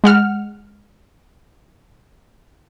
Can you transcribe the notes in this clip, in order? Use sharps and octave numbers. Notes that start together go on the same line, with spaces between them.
G#3 F#5 F6